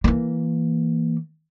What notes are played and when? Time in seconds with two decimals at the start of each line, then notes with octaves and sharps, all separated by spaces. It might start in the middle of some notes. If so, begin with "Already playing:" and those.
0.04 E3 A#3